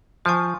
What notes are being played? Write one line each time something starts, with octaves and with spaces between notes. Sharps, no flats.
F3 C5 F5 G#5 C#6